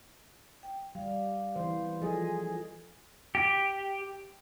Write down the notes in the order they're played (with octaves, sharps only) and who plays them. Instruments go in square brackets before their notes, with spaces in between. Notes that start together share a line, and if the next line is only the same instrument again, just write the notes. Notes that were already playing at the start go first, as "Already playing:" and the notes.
[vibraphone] G5
[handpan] G3 [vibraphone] F5
[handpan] E3 C5
[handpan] F3 G#4 D#5 [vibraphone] A4
[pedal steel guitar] G4